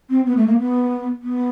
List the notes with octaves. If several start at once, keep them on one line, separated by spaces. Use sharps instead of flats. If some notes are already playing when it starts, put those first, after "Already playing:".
C4
B3
A3
A#3
B3
B3